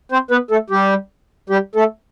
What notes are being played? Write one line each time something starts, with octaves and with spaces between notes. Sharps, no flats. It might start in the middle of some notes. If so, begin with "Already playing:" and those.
C4 C5
B3 B4
A3 A4
G3 G4
G3 G4
A3 A4